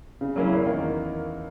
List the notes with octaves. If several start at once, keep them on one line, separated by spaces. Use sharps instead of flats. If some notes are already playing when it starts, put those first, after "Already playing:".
C#3
F#3 A#3 C#4 E4
E2
D#3 A#3